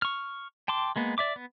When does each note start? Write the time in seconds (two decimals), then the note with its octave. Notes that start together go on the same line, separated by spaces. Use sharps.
0.02 C#6 F6
0.68 G5 A5 C6 D6
0.96 G#3 A#3 B3
1.18 D5 E5 D6
1.36 B3